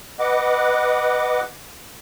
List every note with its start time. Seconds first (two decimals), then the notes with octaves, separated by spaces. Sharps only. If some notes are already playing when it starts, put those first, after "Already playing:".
0.19 B4 D#5 F#5 D6